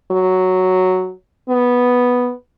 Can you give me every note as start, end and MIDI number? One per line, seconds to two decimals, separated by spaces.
0.11 1.12 54
1.49 2.33 59